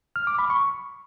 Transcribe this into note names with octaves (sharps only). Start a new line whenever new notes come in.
F6
D6
B5
C#6